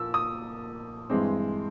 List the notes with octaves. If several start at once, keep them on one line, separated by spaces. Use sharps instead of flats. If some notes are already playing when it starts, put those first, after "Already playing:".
Already playing: A#2 F3 E6
D#6
G2 E3 G#3 C4